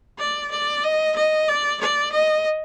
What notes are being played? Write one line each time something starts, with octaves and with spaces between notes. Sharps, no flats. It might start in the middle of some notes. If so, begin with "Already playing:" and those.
D5
D5
D#5
D#5
D5
D5
D#5